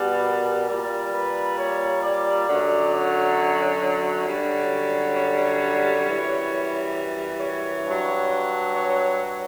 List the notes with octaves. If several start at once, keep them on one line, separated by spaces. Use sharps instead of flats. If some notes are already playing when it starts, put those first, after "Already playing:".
Already playing: B2 G3 B4
A#4
A#2 G3
B4
C#5
D5
F#2 D3 F#3
C#5
C#5
F#2 D3 G3
C#5
F#2 E3 G3
C#5
G2 F#3
C#5